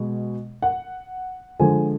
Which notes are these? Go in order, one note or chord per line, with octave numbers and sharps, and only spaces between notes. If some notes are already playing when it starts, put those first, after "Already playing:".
Already playing: B2 G#3
F#5
D3 F3 G#3 G#5